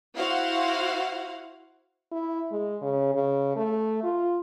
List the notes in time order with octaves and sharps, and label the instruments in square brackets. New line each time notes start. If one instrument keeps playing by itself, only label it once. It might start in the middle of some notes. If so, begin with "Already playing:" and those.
[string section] E4 F#4 C5 F5 F#5
[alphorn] E4
G#3
C#3
C#3
A3
F4